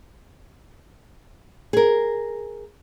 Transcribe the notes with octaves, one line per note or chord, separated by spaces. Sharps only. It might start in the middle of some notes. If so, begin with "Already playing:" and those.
G#4 A#4